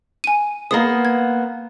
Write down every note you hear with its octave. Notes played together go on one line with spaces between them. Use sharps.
G#5 D#7
A#3 B3 C5 D#6
G#6